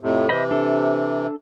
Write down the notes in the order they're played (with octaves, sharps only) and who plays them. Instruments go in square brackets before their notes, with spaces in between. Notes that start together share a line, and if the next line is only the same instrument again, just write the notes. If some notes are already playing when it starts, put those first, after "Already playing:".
[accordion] F2 A2 C3
[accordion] C3 E3 [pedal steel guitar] C5 D#5 B5
[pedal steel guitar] D4 A4